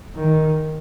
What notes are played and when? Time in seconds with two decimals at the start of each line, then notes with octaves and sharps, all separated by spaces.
0.16 D#3